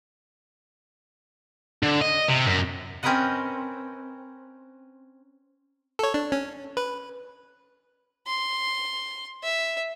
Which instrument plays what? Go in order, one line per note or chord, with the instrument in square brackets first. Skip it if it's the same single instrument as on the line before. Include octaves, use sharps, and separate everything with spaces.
[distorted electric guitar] D3
D#5
C3
F#2
[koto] C4 C#4 A#4 B4 D#5 F#5
[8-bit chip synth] A4 C#5
D4
C#4
B4
[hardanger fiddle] C6
E5